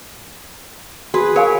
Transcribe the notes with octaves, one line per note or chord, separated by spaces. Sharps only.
F#4 G#4 B4
A#4 C#5 F5 G#5